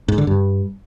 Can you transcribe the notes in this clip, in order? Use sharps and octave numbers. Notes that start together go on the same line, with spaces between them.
G#2
D3
G2